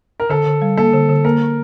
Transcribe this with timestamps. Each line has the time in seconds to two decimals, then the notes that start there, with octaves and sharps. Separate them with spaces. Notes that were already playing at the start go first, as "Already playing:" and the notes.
0.20 A#4
0.30 D3 A4
0.47 D3
0.62 G3
0.77 A#3 A4
0.93 D3
1.09 D3
1.25 A#3 A#4